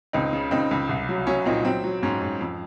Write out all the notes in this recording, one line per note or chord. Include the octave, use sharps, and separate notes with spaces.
C#2 C4 D#4
C#3
C#2 C4 D#4
C#2
C2
F#3
F#3 C#4
A#2 C4 D#4
F#3 C4
F#3
G#2 C#4
G#2
F2